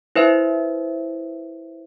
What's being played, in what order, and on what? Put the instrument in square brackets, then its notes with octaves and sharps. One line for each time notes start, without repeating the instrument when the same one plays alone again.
[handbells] E4 B4 C5 E5